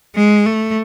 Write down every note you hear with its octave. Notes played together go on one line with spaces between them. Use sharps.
G#3
A3